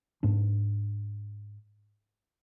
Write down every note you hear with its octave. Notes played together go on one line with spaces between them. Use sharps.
G#2 A#3 D4